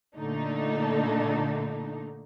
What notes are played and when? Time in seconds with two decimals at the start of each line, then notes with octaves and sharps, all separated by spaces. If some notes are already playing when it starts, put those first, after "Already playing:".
0.17 A#2 D3 A3 D4 D#4